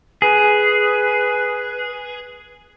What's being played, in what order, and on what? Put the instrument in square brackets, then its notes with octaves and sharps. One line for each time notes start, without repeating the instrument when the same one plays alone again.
[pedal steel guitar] G#4 [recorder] B4